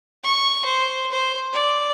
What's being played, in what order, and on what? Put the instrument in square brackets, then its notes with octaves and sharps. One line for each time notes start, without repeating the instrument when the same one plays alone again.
[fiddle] C#6
C5
C5
D5